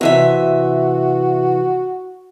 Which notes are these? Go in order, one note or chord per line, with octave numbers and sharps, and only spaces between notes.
C3 E3 F#4 E5